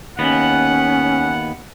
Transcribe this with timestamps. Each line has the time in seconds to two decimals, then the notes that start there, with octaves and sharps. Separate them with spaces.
0.19 D#2 B3 C#4 F#5